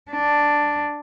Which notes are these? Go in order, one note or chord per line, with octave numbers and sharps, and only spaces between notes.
D4